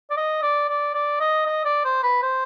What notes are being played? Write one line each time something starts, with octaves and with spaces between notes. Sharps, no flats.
D5
D#5
D5
D5
D5
D#5
D#5
D5
C5
B4
C5